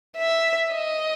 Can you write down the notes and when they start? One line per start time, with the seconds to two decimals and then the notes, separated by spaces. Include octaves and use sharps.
0.17 E5
0.72 D#5